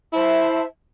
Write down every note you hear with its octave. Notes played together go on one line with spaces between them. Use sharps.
E4 C5 E5 A5